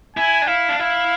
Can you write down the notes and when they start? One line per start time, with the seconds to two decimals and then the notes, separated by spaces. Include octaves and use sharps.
0.16 E4 G#5
0.42 D4
0.47 E4 F5
0.69 D4
0.79 E4 F5